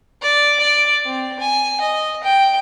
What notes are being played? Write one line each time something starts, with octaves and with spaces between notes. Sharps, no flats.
D5
D5
C4
G#5
D#5
G5